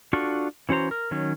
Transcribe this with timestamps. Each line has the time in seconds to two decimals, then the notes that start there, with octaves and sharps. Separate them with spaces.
0.13 D4 F4 F#4 A4 C#6
0.69 E3 C#4 F#4 C5 A#5
0.91 A#4
1.11 D#3 F#3 C#4